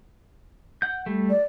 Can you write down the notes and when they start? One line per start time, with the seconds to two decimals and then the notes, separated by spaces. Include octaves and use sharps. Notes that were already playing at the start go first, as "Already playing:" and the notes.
0.82 F#5 G6
1.06 G3 A3
1.30 D5